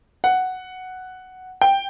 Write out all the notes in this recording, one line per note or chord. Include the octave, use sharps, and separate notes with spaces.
F#5
G5